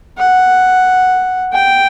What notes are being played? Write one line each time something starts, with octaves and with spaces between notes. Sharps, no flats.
F#5
G5